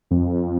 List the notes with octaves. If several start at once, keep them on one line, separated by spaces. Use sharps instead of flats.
F2